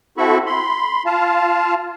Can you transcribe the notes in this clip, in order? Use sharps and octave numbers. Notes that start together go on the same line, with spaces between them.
C4 E4 F#4 A4 B5 C#6
B5 C6
F4 F5 A5